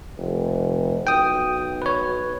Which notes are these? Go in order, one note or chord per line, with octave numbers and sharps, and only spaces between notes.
F1
B1 G5 D#6
B4 C#5